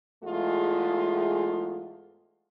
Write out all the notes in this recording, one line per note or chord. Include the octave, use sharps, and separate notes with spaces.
E2 G#2 G#3 A3 F4